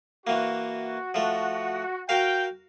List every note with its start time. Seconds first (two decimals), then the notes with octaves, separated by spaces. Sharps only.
0.27 E3 A#3 F#4
1.14 F3 A3
2.09 F#4 A#4 F5 G5